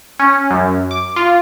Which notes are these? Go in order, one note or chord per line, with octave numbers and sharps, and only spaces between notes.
C#4
F#2
D6
F4